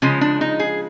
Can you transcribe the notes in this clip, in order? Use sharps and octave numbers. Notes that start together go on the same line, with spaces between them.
C#3 F3 G#3 C#4
D4
D#4
G#4